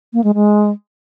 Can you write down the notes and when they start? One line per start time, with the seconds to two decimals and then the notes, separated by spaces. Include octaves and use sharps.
0.13 A#3
0.24 G#3
0.34 G#3